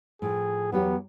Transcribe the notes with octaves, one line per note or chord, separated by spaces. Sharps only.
A2 F3 G#4
E2 F#3 B3 G4